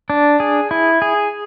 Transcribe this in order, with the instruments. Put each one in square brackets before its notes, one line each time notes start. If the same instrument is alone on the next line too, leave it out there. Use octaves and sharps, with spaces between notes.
[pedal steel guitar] D4
G#4
E4
G#4